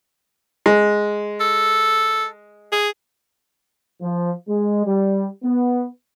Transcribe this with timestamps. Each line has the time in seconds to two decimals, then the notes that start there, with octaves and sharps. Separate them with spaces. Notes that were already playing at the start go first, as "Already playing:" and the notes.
0.66 G#3
1.40 A4
2.72 G#4
4.02 F3
4.49 G#3
4.86 G3
5.44 B3